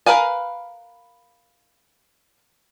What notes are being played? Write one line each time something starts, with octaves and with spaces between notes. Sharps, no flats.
A#4 B4 F5 G#5